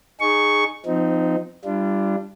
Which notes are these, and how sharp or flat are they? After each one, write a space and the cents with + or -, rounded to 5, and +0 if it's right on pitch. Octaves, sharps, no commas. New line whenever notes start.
D#4 -25 G#4 +0 C#6 +0
F3 +0 C4 -30 D#4 +0
G3 +0 D4 +0 F4 -35